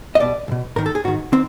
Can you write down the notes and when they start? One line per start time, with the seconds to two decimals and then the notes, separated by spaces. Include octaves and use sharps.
0.15 D#5
0.20 C2 B2 D5
0.48 C2
0.52 B2
0.76 G#2 D#3 A#4
0.86 A4
0.95 G#4
1.04 G#2 D#3 F#4
1.32 D#3 C4